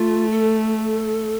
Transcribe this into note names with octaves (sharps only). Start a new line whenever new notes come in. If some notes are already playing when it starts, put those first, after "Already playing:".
Already playing: A3 F4
A4